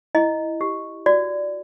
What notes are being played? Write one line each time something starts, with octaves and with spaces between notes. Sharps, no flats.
E4 D#5
G4
F#4 D5